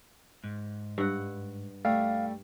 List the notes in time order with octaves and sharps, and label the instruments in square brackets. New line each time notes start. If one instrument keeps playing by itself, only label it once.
[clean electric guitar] G#2
[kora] G2 F#5
[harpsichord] G3 A3 [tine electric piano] F5